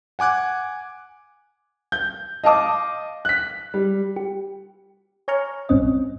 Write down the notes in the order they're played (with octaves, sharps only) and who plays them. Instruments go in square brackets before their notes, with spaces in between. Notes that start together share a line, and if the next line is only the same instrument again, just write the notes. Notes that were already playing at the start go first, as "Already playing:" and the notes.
[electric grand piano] F#5 G#5 D6 F#6 G#6
[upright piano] G6
D#5 F5 A5 D6 D#6
F#6 B6
G3
[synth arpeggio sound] G4
C#5 G#5 A#5 C#6 F6
A#1 G2 C4 C#4 D#5